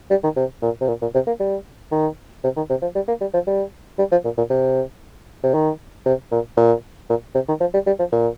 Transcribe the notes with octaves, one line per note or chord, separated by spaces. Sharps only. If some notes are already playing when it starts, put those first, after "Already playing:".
G3
D#3
C3
A#2
C3
A#2
A#2
C3
A#3
G3
D#3
C3
D#3
C3
F3
G3
A#3
G3
F3
G3
G3
F3
A#2
A#2
C3
C3
D#3
C3
A#2
A#2
A#2
C3
D#3
F3
G3
G3
F3
A#2